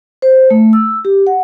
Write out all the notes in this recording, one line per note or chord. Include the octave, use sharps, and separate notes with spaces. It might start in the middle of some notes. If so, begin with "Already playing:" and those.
C5
A3
E6
G4
F#5